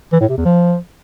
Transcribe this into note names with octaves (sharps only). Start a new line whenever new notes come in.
E3
A2
C3
E2
F3